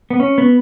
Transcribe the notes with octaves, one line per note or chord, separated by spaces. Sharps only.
B3
C#4
B3